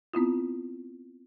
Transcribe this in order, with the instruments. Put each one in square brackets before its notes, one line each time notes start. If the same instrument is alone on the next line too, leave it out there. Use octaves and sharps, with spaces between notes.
[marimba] B3 C4 E4 F4